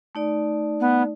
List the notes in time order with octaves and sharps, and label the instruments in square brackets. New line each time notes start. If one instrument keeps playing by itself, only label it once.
[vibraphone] A3 D#4 D5
[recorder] B3